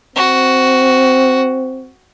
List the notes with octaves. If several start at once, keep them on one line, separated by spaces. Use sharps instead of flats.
C4 F#4